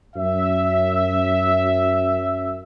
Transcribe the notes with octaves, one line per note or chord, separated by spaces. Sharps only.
F#2 E5